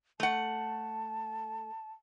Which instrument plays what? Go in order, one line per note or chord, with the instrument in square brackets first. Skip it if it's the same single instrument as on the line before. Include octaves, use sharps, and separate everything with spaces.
[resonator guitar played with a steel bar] A3 F#5 [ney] A5